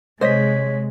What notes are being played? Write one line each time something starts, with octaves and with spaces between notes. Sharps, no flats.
C3 G#3 C5 C#5 D#5 B6